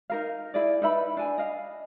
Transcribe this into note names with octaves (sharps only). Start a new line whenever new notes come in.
D#4 A#4 F5
E4 G#4 D5
D#4 B4 E5 B5
D4 G#5
D#5 F5